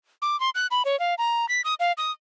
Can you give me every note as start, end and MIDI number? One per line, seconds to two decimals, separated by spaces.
0.22 0.39 86
0.40 0.50 84
0.55 0.67 90
0.71 0.83 83
0.85 0.99 73
1.00 1.15 77
1.18 1.49 82
1.49 1.61 95
1.64 1.74 87
1.80 1.92 77
1.97 2.11 87